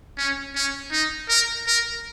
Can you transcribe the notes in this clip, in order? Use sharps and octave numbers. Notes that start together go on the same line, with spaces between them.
C#4
C#4
D#4
A#4
A#4